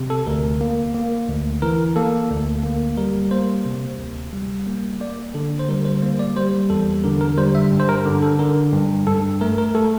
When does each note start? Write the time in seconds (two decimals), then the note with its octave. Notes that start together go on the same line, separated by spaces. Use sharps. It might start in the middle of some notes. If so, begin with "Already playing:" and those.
Already playing: C3
0.10 A4
0.26 D2 A#4
0.61 A#3
0.94 A#3
1.28 D2
1.62 E3 A#4
1.96 A#3 A4
2.30 D2
2.63 A#3
2.97 G3 A#4
3.31 A#3 C5
3.66 C3
3.99 D2
4.33 G3
4.67 A#3
5.00 A#3 D5
5.34 D3 A4
5.59 C5
5.69 G3 A#4
5.85 C5
6.02 A#3 C5
6.19 D5
6.36 G3 C5
6.70 E2 A4
7.04 D3 A#4
7.21 A#4
7.37 G3 C5
7.55 E5
7.72 G2
7.80 C5
7.89 A#4
8.05 D3
8.22 A4
8.39 D3 A#4
8.73 G2
9.07 G2 A4
9.41 A3 A#4
9.58 A#4
9.74 A3 A4